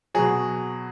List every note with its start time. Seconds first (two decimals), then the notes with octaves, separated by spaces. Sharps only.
0.15 B2 F#3 G#4